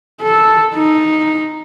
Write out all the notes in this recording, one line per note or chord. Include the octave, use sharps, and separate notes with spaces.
A4
D#4